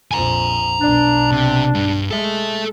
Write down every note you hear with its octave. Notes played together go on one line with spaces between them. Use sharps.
A#1 F2 G#5 A#5
B1 B2 D4
C3
G2
G#3 A4 E5